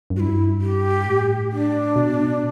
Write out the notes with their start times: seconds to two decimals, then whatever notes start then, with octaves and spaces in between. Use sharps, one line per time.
0.10 F#2
0.16 G2 F#4
0.20 E4
0.61 G4
1.06 A2
1.52 D4
1.96 B2